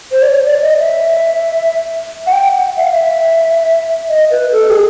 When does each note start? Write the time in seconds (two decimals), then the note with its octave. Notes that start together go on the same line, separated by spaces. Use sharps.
0.12 C5
0.22 D5
0.28 C#5
0.46 D5
0.62 D#5
0.78 E5
2.27 F#5
2.33 G5
2.54 F#5
2.77 E5
2.84 F5
2.93 E5
4.09 D#5
4.31 B4
4.52 A4
4.70 G4
4.74 G#4